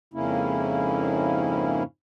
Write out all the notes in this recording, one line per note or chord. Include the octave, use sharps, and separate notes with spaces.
F2 G#2 C#3 A#3 C#4 E4